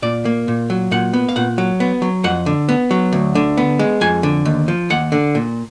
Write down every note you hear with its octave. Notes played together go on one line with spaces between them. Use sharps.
A#2 D5
A#3
A#2
F#3
A#2 F#5
B3
F5
A#2 F#5
F#3
B3
F#3
F2 F#5
D3
B3
F#3
D2
D3
B3
G#3
F2 G#5
D3
D#2
F3
D#2 F#5
D3
A#2